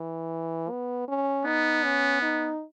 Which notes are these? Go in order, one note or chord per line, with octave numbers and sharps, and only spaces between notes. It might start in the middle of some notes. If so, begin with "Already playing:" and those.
Already playing: E3
B3
C#4
B3 D#4
C#4
D#4